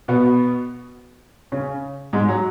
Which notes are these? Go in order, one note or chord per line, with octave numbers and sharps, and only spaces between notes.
B2 B3
C#3 C#4
G#2 G#3
F#3